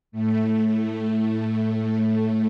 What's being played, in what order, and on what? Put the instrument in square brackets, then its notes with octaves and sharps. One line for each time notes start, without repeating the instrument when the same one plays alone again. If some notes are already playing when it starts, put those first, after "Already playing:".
[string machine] A2 A3